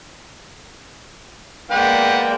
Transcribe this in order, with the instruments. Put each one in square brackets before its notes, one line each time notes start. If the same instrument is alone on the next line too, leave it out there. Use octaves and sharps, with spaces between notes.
[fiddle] G#3 A#3 [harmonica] B4 F#5 [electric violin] D5 G5